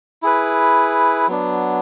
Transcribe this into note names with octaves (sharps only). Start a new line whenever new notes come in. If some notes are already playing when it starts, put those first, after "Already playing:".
E4 G#4 B4
F#3 B3 D4